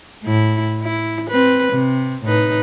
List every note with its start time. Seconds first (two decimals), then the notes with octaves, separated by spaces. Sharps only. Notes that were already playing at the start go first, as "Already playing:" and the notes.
0.24 A2 E4
0.83 E4
1.30 C4 B4
1.72 C3
2.23 A2 D#4 B4